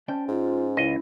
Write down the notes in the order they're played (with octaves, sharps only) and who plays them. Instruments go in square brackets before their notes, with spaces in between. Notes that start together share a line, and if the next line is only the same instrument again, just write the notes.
[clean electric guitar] C#4 C5 D5 [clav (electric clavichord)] G5 [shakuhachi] A5
[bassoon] G#2 [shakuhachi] F4
[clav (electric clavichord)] C#2 D#5 [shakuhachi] E4